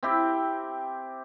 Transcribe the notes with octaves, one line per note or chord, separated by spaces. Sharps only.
C4 E4 G4